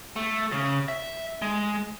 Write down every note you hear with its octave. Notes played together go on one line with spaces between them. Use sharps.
A3
C#3
E5
G#3